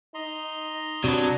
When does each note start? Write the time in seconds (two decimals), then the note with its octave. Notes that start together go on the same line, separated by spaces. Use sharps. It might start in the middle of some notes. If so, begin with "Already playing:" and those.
0.15 D#4 D#5 A#5 C6
1.04 C3 F#3 B3 D4